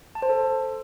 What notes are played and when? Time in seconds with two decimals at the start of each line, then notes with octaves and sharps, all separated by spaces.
0.15 A5
0.22 C5
0.30 A4